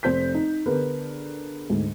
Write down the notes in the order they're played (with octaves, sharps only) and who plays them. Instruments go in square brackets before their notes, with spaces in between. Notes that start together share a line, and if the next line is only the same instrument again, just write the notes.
[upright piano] F1 C5 G6 B6
D#4
D3 B3 G#4 A#4 B4
D2 G#2